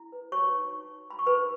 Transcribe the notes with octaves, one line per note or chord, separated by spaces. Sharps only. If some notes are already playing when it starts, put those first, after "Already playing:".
Already playing: E4
B4
F#4 C#5 C#6
D#4
D#4
C#5
F#4 B5
C#6
D#4 B4 B5